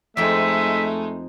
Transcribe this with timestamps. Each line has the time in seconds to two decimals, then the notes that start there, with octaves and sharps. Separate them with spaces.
0.17 F2 G#3 A3 D#4 E5 G5